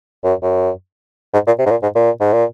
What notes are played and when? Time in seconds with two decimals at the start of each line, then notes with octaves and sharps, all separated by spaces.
0.24 F#2
0.42 F#2
1.33 G#2
1.47 A#2
1.59 C3
1.66 G#2
1.71 A#2
1.82 G#2
1.95 A#2
2.20 G#2
2.33 A#2